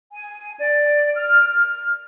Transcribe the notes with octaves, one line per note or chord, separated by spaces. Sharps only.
G#5
D5
F6
F6